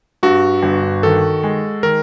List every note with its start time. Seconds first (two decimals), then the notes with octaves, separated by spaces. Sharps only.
0.23 G2 F#4
0.62 G1
1.03 D#3 A4
1.43 G#3
1.83 D#3 A#4